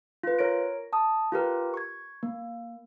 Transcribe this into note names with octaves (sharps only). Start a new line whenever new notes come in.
F4 B4
A#4 C#5 A#6 D7
A5 D#6
F4 G4 A#4 B4
C#6 G#6
A#3